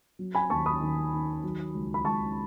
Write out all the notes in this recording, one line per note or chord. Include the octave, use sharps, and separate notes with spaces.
F#3
G#5 B5
D#2 A5 C#6
B5 D#6
D#3
D#3
F#3
C#2
B5
C#2 A5 C#6